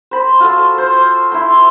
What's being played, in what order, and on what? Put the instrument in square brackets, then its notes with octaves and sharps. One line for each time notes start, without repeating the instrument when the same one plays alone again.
[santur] C5 B5
F4 F#4 A4
C5
E4 C6